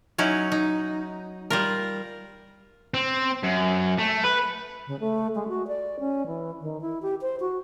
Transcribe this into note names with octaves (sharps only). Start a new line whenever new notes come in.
F#3 C#4 D#4 E4
D#4
G3 F4 A#4
C4
F#2
A3
B4
C#3
A3
G#3
F#4
D5
C#4
E3
D#3
E4
G4
C5
F#4